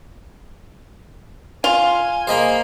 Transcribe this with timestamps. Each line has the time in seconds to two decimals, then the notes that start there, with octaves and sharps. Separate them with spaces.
1.64 F4 G#5
2.27 A#3 G#4 C5 D#5 B5